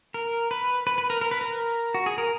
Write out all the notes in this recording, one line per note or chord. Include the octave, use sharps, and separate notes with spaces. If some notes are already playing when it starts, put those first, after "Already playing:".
A#4
B4
B4
B4
A#4
A#4
B4
A#4
F#4
G#4
A#4